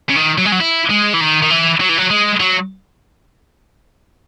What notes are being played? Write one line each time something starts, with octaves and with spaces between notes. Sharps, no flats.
C#3
D#3
F#3
G#3
F#3
E4
G#3
E3
D#3
D#3
E3
F#3
E3
F#3
G#3
F#3